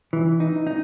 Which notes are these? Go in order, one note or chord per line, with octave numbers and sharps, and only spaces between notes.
E3
D#4
D#4